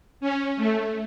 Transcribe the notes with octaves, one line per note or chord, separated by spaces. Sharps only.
C#4
A3